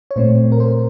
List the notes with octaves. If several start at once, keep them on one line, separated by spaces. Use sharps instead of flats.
C#5
A#2 A3 C4 C5
A#4
C5